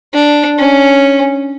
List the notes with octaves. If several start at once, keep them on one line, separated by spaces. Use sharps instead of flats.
D4
C#4